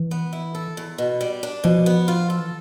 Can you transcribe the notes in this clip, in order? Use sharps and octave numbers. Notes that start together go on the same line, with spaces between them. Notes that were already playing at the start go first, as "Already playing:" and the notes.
Already playing: E3
B3
E4
A4
E2
B2
G3
D4
B2 F3
B3
F4
A4
E3